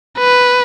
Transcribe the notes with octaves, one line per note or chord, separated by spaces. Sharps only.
B4